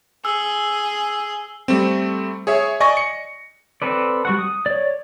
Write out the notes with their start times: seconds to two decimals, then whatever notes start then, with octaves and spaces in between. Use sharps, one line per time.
0.25 G#4 E6
1.68 G3 A3 C4
2.47 G#4 C#5 E5
2.80 D5 D#5 G#5 C#6 A#6
2.97 C#7
3.82 C4 A4 B4 D5
4.25 G3 F#4 F#5
4.38 D#6
4.66 C#5 D5